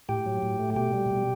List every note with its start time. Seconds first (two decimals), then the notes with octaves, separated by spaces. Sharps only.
0.09 A2 G4 G5
0.26 F#3
0.43 A2
0.59 A3
0.76 B2 G4 G5
0.93 G3
1.11 B2